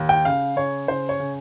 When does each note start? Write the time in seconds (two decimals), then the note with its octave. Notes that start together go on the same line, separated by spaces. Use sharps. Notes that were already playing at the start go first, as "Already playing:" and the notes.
Already playing: D#2
0.09 G5
0.25 C#3 F5
0.56 C#3 C#5
0.88 C#3 C5
1.09 C#5
1.20 C#3